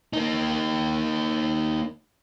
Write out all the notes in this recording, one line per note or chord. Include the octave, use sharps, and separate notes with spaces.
A#3 D#4